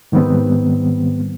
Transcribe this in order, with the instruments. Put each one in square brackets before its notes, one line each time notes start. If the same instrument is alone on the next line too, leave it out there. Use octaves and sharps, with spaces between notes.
[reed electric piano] G#2 D#3 G3 B3 C4